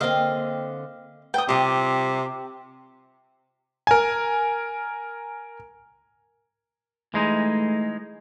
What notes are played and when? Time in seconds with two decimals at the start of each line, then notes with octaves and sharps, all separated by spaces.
0.01 D3 A#3 C4 D#5 F5
1.34 B4 D5 G5 D#6
1.49 C3 G3 C4 F4 G4 D#6
3.87 A#4 G#5
7.14 E3 G#3 A3 D#4